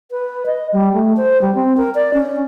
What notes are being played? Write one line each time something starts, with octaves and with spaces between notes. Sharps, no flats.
B4
D#5
G3
A3
C5
G3
C4
A#4
D5
C#4